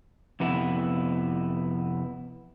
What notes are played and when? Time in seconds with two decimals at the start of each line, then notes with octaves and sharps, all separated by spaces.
0.40 F2 C3 B3 E4